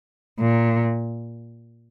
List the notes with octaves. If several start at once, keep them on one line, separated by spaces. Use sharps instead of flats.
A#2